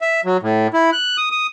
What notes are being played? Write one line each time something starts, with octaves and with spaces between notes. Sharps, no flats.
E5
F#3
A2
E4
F#6
D#6
D#6